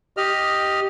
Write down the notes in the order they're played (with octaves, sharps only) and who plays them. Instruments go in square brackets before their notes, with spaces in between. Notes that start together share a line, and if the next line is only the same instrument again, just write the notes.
[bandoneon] G4 D#5 F6